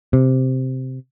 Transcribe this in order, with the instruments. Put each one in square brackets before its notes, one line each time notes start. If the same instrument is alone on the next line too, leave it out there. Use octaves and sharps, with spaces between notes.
[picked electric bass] C3